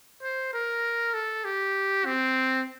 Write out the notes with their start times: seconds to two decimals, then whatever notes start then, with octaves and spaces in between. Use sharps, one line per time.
0.22 C5
0.53 A#4
1.14 A4
1.45 G4
2.06 C4